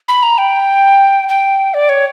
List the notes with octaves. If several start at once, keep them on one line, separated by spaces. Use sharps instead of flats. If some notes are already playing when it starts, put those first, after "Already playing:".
B5
A#5
G5
G5
D5
C#5